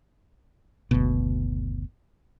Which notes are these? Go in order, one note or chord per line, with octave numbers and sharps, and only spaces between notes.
F#1 D2 B2